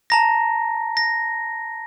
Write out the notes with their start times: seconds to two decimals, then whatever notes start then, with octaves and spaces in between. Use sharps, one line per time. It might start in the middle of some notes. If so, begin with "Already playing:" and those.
0.10 A5 A#5 A#6
0.97 A#6